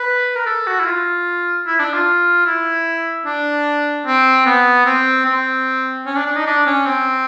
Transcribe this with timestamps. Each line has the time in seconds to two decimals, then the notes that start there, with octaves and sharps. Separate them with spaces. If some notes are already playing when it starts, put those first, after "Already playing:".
Already playing: B4
0.36 A#4
0.46 A4
0.67 F#4
0.80 E4
0.86 F4
1.66 E4
1.80 D4
1.93 F4
2.46 E4
3.26 D4
4.06 C4
4.46 B3
4.86 C4
5.26 C4
6.06 C#4
6.16 D4
6.26 D4
6.36 D#4
6.46 D4
6.66 C#4
6.86 C4